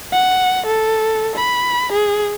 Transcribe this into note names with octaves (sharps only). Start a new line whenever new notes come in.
F#5
A4
B5
G#4